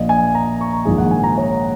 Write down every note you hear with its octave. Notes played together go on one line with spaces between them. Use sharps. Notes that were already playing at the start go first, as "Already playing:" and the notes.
Already playing: A#1 A#2 D#5
G#5
A#5
C#6
A#5
A#1 G#2 D#3 G#4
F#5
G#5
A#5
C#5